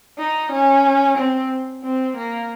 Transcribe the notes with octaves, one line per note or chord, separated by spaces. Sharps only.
D#4
C#4
C4
C4
A#3